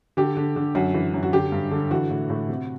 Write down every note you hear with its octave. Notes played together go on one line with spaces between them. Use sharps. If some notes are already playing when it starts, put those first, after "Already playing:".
D3 G4
D3
D3
F#2 F#4
E3
F#2
F#4
D3 G4
G2
D3
E3 F#4
A2
A2
C3